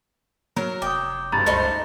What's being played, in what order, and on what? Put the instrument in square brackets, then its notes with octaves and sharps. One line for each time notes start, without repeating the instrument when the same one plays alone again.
[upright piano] F#3 [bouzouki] A#4
[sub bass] F1 [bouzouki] G5 [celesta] D6 D#6
[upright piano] F#1 G2 [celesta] A#5 A6
[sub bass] C#2 [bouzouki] A3 D#4 C5